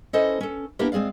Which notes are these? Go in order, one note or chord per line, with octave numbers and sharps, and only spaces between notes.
C#4 E4 A4 C5 D#5
C#4 A4
A#3 B3 D4 E4 G4 A#4
G#3 C4 G#4 D5 F5